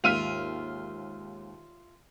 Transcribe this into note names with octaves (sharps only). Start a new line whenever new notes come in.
D#2 G#2 F4 E5 F6 D#7 F7